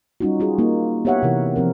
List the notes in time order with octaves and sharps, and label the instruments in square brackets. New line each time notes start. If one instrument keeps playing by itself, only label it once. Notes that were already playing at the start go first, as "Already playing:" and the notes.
[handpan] G3 C#4 D#4 F4 F#4
F4 F#4 G#4
A#3 D#4 F4
B3 G4 C#5 E5 F#5
C3 E3 E4 A#4
F3 C4 A#4